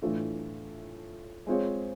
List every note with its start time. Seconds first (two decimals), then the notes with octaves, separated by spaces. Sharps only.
0.02 A2 E3 A3 D4 F4
1.47 G#3 C4 F4 G#4 C#5